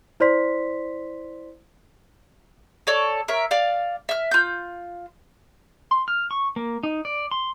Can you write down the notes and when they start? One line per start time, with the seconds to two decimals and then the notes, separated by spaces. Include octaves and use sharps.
0.20 E4 C5 D5 C6 B6
2.87 A4 C#5 D5
3.28 A#4 C#5 E5
3.51 D5 F5
4.09 E5 F6
4.31 F4 G6
5.91 C6
6.08 F6
6.31 C#6
6.56 A#3
6.83 D#4
7.05 D5
7.31 C6